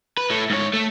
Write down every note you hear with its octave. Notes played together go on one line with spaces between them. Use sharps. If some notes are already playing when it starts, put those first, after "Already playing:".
B4
A2 A3
G#2 C#5
A3